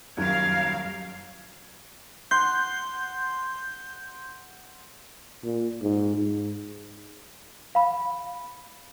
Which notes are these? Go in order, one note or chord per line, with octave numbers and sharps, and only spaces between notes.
D#1 F#2 F#3 A#4 F5 G#6
F#5 C6 G6
A#2
G#2
G#2
F5 B5